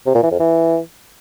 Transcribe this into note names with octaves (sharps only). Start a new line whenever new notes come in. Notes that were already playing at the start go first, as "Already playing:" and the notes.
C3
A#2
E3
F2
E3